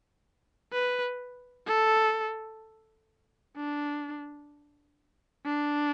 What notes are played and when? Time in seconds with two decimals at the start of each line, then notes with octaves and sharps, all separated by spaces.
0.73 B4
1.67 A4
3.56 D4
5.46 D4